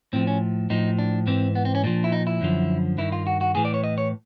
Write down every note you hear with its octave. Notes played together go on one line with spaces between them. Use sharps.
A2 F3 C4
C#4
A2 F3 D#4
D4
G#2 E3 C4
B3
C4
C#4
A#2 F3 D4
E4
D#4
E4
F#2 D3 F3
G2 D#3 E4
F4
F#4
F#4
A2 E3 G#4
D5
C#5
D#5
C#5